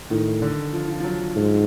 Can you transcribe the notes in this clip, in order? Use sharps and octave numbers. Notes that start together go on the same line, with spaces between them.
A2 D#3
D3
F3
F3
F3
F#3
F3
G#2